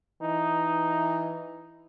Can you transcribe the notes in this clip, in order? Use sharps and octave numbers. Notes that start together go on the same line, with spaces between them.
E3 D#4